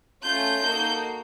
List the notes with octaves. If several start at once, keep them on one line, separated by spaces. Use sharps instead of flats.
A3 C#4 F4 G6
A#3 D#4 F#4 A4